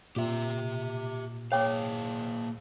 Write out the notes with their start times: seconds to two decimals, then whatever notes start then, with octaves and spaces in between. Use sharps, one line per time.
0.16 A#2 G4 E5
1.52 A#3 G#4 C#5 F5 G5 D6